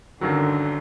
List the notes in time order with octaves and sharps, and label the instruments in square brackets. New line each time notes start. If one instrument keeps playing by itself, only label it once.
[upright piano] G1 F#2 D#3 F#3 [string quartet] D3